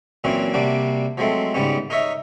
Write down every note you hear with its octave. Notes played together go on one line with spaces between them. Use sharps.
A#2 E3 F#3 C4 C#4 F#4
C3 G3 A#3 D4 F#4
F3 F#3 G#3 A3 C4
G#2 C#3 G3 B3 C#4
D#4 A#4 C#5 E5